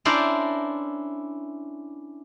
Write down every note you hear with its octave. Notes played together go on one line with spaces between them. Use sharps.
C#4 D4 E4 A#4 C5 D5